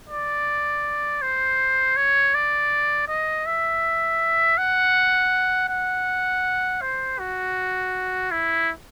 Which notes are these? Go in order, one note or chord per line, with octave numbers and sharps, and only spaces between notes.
D5
C5
C#5
D5
D#5
E5
F#5
F#5
C5
F#4
E4